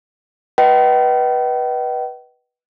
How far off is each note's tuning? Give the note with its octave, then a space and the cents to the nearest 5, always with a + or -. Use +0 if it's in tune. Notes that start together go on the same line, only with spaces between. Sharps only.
B4 -15 D#5 +0 G5 -40